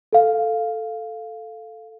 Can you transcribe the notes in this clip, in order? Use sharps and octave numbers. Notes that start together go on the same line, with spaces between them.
A4 F5